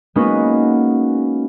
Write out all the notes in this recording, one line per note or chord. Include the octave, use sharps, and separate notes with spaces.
G#3 A#3 B3 C#4 D#4 F#4